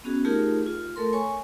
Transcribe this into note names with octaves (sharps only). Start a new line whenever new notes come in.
B3 C#4 F#4 G#4
A3 D#4 F4 G4 G#4 A#4
F4
A3 A4 A#4 C6
C#5 G#5 C#6